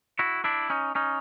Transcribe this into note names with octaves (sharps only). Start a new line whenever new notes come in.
E4 F#4
D4 E4
C#4 D#4
C#4 D#4